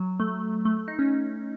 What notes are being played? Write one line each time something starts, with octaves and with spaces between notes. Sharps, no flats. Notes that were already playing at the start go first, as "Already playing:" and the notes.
Already playing: F#3
A3
A3
A3
D#4
C#4